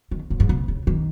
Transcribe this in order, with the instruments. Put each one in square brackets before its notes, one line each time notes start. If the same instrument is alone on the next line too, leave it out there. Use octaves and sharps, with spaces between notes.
[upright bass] D#3
F#2
G#2
C3
C#3
D#3